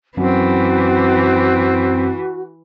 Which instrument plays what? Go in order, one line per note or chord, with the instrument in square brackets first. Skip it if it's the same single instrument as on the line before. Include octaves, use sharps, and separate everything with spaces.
[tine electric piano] F#2 [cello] E3 [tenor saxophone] C4 [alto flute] F#4